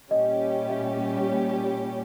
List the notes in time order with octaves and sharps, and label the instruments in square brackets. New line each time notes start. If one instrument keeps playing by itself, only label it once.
[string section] A#2 G3 C#4 G4 [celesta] D#5
[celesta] E5